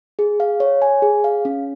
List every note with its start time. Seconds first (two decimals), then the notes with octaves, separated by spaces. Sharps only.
0.19 G#4
0.40 F5
0.60 C#5
0.82 G#5
1.02 G#4
1.24 F5
1.45 C#4